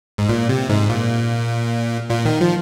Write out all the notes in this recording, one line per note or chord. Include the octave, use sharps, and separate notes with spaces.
G#2
A#2
C3
G#2
A#2
A#2
D#3
F3